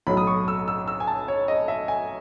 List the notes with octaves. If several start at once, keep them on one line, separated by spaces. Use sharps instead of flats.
B1 A2 F#3 B5
D#6
C#6
E6
E6
E6
G#5
A5
C#5
D#5
E5
G#5